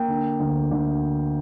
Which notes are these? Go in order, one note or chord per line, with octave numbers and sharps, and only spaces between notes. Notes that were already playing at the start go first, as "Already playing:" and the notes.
Already playing: A#3 G5
D3
D2
D2